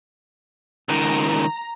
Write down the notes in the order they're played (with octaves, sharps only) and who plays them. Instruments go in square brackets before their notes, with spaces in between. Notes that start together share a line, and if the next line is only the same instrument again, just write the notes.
[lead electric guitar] C#2 D#3 [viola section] A#5